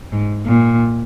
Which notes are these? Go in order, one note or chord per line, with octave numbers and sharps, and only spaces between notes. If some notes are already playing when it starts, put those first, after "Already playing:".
G#2
A#2